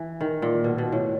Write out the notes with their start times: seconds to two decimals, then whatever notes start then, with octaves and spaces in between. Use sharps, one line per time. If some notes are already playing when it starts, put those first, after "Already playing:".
Already playing: E3
0.21 D#3
0.42 A#2
0.64 B2
0.78 B2
0.92 A2